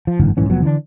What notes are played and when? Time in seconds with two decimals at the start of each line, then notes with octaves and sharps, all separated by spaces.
0.07 F3
0.19 F#1 G#2 D3 E3
0.37 B1 G#2 E3 C#4
0.49 F1 F3 F#3 B3
0.62 D3 E3 G#3 D4